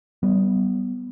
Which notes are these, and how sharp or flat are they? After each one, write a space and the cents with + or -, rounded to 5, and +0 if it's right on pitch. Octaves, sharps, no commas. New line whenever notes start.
G3 -30 B3 +0